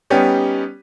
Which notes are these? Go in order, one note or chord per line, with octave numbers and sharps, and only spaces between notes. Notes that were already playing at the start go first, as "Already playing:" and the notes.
G3 B3 C#4 D#4 G4